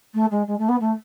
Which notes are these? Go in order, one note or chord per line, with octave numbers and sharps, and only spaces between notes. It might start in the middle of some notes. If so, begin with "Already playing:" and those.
A3
G#3
G#3
A3
B3
A3